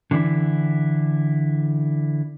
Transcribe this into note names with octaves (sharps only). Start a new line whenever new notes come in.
D3 E3 D4 E4